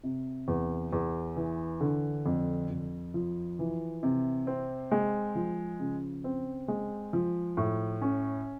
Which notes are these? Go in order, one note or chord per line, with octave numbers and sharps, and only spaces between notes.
C3
E2
E2
E3
D3
F2
F2
F3
E3
C3
C4
G#3
F3
C#3
C4
G#3
F3
A2
C#4